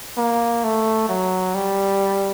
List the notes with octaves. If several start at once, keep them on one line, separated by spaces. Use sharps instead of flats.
A#3
A3
F#3
G3